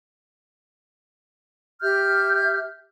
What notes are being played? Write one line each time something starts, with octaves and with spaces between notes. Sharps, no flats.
G4 E5 F6 G6